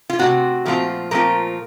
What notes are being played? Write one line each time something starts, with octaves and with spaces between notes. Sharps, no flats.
F4
C3 F3 A3 C4 F#4
A#2 F3 A3 C4 F4
A#2 F3 A3 C4 F4 A#4